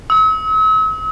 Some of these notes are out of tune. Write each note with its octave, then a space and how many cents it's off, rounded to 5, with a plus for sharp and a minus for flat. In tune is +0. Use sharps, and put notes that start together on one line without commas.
E6 -45